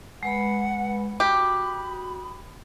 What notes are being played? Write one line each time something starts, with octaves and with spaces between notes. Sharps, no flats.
G#3 B4 F#5 B5
F#4 G4 B5 D#6